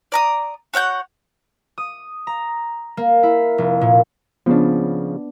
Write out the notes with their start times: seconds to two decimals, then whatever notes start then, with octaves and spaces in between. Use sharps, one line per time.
0.12 D5 A#5 D#6
0.74 F#4 C#5 F#5 G6
1.78 D#6
2.27 A#5
2.97 A#3
3.23 E4
3.58 F1
3.81 A#2
4.46 C#3 F3 B3 D4